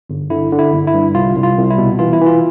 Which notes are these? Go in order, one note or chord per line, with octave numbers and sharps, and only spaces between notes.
G1
D3 E4
D3
E4
G1
E4
G2
C2 F4
C2
F4
C2
E4
B2
E3 F4
E4
E3
F4